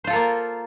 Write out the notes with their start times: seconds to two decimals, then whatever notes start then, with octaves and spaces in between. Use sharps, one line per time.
0.04 C5
0.07 F4
0.10 A4
0.13 A#4
0.16 A#3